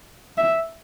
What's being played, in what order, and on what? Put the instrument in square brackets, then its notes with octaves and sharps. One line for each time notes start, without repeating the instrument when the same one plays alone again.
[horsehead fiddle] E5